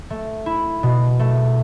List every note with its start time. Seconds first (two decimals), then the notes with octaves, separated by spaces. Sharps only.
0.10 A3
0.46 E4
0.83 B2
1.19 A3